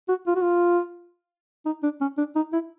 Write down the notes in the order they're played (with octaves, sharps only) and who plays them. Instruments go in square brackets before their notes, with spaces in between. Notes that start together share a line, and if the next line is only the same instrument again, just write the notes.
[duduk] F#4
F4
F#4
F4
D#4
D4
C#4
D4
D#4
E4